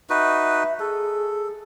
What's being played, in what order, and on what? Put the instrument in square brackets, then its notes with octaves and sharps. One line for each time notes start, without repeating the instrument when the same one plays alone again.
[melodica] D#4 F#4 B4 [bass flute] E5
[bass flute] G#4 [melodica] A4